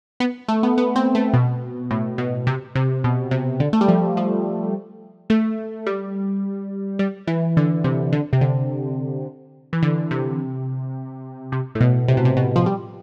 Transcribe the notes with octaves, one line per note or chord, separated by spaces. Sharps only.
B3
A3
B3
B3
C4
A3
B2
A2
B2
C3
C3
B2
C3
D3
A3
G3
F3
F3
A3
G3
G3
E3
D3
C3
D3
C3
D3
E3
D3
C3
C3
A2
B2
C3
B2
C3
B2
F3
G3